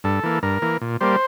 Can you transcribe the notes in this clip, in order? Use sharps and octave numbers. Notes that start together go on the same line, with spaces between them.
G2 A4
E3 A#3
G2 A#4
E3 A#3
A#2
G3 A#3 C5